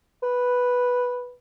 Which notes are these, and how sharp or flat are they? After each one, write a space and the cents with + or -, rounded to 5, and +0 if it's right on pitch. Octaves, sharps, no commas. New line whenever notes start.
B4 -5